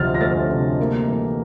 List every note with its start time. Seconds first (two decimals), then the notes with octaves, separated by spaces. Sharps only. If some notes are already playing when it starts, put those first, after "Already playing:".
Already playing: D2 C3 F3 A3 F6 A6
0.14 A#6
0.21 A3 F6 A6
0.50 C3
0.79 A#3
1.08 E3